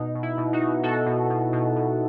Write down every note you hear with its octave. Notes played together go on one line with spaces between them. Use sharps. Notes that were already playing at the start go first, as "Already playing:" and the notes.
Already playing: B2 D#4
B2
E4
B2
D#4 F#4
B2
B2 F#4 A4
B2
B2
B2
B2